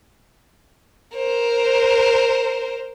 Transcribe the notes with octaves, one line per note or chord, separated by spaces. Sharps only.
A#4 C5